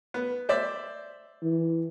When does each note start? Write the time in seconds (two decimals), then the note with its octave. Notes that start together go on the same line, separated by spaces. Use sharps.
0.14 B3
0.49 C5 D5 E5
1.42 E3